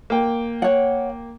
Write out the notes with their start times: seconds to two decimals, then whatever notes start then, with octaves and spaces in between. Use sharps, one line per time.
0.10 A#3 G5
0.62 C#5 F#5